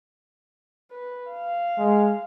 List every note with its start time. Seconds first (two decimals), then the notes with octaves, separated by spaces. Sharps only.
0.91 B4
1.31 F5
1.78 G#3